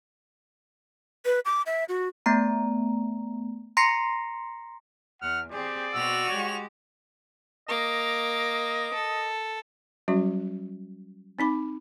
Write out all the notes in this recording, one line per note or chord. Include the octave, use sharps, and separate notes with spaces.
B4
D6
E5
F#4
A3 B3 A#5
A#5 C6 A#6 C7 C#7
E2 F#5 F6
C4 G4 G#4 D5
B2 C4 F#4 E6 F7
G#3 G4 C#5
A#3 D#5 D6
A4
F#3 G3 C#4 F#4 E5
C4 D#4 B5 D6